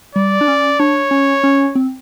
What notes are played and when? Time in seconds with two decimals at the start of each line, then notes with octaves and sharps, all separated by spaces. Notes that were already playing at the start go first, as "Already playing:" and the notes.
0.15 G3 D5
0.41 D4
0.48 C#4
0.80 D4 C#5
1.11 C#4
1.44 C#4
1.75 C4